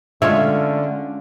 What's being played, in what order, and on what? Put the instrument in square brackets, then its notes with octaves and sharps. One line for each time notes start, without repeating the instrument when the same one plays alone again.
[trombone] D3 [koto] G#3 A3 [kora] C#4 F4 C#5 [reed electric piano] E5